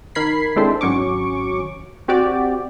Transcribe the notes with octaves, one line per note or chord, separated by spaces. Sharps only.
D#3 A#4 B5 G#6 B6 C7
G#3 C4 D4 E4 A4 C5
G#1 F#3 C#4 C#6 D6
C4 F#4 G4 D5